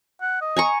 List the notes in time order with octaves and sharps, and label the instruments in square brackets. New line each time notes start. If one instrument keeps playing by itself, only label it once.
[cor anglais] F#5
D#5
[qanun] G#5 A#5 C#6